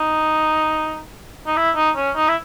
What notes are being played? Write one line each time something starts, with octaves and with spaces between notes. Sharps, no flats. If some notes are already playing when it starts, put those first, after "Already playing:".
Already playing: D#4
D#4
E4
D#4
C#4
D#4
E4